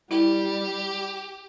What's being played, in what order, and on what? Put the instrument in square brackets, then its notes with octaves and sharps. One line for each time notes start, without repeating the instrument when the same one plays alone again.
[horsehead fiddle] G3 [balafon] E4 [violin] G4